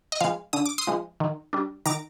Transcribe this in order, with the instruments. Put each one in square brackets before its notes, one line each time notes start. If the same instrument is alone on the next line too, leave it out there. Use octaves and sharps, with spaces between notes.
[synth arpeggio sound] D#5
F3 G#3 F5
D3 D#6
D6
C6 D#6
F3 G#3
D#3
G3 D4
D#3 A#5 D6